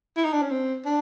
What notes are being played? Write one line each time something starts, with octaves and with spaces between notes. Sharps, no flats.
E4
D#4
D4
C#4
C4
D4